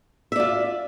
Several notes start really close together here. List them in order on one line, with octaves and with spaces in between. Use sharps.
E5 D5 F4